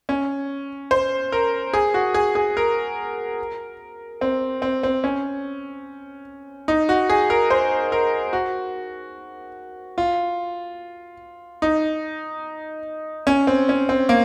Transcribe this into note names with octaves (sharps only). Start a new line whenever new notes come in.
C#4
C5
A#4
G#4
F#4
G#4
G#4
A#4
C4
C4
C4
C#4
D#4
F#4
G#4
A#4
C5
A#4
F#4
F4
D#4
C#4
C4
C#4
C4
A#3